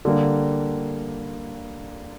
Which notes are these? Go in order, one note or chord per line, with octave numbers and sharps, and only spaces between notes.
D3 G3 A#3